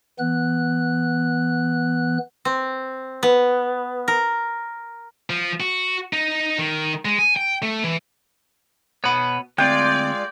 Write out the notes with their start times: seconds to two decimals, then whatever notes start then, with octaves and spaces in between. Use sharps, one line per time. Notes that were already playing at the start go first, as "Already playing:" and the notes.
0.19 E3 B3 F#6
2.45 C4
3.23 B3
4.08 A#4
5.30 F3
5.60 F#4
6.13 D#4
6.58 D#3
7.05 G#3
7.19 G#5
7.36 G5
7.62 A3
7.84 E3
9.04 B2 B3 C#5 B5
9.58 D2 G#3 C4 F4 D5 G5